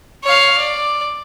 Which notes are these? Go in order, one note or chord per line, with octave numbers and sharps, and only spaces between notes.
C#5 F5
D5